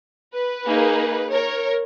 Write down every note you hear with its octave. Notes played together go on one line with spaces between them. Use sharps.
B4
A#3 D#4 G#4
A#4 C#5